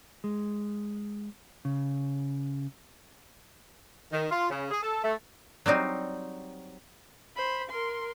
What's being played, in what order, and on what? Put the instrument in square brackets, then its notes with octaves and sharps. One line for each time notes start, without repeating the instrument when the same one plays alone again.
[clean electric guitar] G#3
C#3
[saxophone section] D#3
F4
C#3
G#4
A4
A3
[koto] F#3 G3 C4 D#4
[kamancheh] C5 B5
A#4 C6